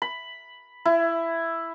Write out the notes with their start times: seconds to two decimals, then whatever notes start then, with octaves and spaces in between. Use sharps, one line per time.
0.02 B5
0.86 E4